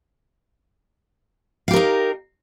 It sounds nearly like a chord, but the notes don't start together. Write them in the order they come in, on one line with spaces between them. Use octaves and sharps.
F5 G4 A#4 D#4